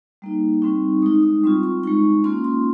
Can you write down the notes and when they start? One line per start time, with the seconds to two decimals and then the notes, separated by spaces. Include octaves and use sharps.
0.22 G3 A#3 D#4
0.62 G3 C4 D#4 C#6
1.02 G#3 D#4 D#6
1.23 D#6
1.44 G3 C4 F4 C#6
1.63 C#6
1.83 G#3 D#4 C#6
2.24 A#3 C#4 F4 C6
2.44 C6